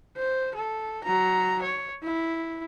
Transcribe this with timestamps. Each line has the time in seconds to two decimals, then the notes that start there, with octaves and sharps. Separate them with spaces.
0.17 C5
0.55 A4
1.04 F#3 A#5
1.62 C#5
2.03 E4